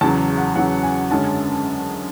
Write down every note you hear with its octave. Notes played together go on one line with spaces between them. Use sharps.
E2 C#3 F#3 A5
F#5
E2 C#3 F#3 F#5
G#5
F#2 D3 G#3 C#4 A5